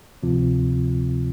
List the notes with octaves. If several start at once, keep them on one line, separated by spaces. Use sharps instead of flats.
D2 C3 F3 C4 F4